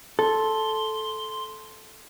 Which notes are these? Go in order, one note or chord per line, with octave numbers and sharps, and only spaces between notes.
A4 C6